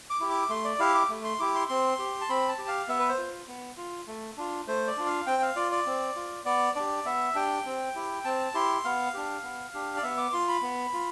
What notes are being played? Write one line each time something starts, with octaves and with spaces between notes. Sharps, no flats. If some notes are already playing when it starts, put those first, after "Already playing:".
D6
E4 G4
D6
A3 C6
D5
E4 G4 F5
D6
A3
C6
E4 G4 D6
C6
C4 C6
G4
A5
C4 B5
A5
G4
F5
B3 E5
B4
C5
F4
B3
F4
A3
D4 F4
A3 C5
D5
D4 F4
F5
C4 G5
F5
F4 D5
D5
C4
F4
B3 D5
D4 G4 D5
B3 E5
D4 G4 G5
C4
E4 G4
C4 A5
E4 G4 C6
B3 F5
D4 G4
B3
D4 G4
D5
B3 E5
D6
F4 C6
B5
B3
F4